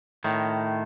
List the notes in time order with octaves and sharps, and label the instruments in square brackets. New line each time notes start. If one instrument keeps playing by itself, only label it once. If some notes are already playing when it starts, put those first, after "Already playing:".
[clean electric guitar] A2 D#3